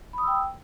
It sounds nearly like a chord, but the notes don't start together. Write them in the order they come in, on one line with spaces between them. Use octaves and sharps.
B5 D#6 E6 G5